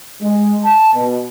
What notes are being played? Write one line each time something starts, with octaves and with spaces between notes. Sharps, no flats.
G#3
A5
B2